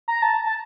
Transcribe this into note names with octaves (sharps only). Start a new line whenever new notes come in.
A#5
A5
A5